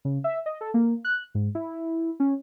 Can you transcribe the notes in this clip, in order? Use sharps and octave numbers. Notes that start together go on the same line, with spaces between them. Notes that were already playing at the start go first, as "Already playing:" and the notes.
C#3
E5
D#5
A4
A#3
F#6
G#2
E4
C#4